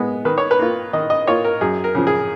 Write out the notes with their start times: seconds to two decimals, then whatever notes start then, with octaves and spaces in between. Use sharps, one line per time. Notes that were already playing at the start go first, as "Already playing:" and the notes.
Already playing: G#3 B3
0.25 D#3 B4
0.38 C#5
0.51 B4
0.59 A#3 F4
0.93 D#3 D#5
1.10 D#5
1.27 A#3 F4 C#5
1.44 A#4
1.61 F#2 G#4
1.84 A#4
1.95 C#3 F3
2.07 G#4